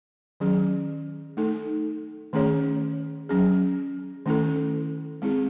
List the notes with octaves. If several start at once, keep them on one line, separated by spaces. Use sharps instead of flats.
D#3 F#3 C#4 G#4
A3 D#4 A4
D#3 A3 C#4 G#4 C#5
F#3 C#4 G#4
D#3 A3 C#4 E4 A4
G#3 C4 E4 G#4